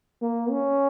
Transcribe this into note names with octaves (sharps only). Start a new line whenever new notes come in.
A#3
C#4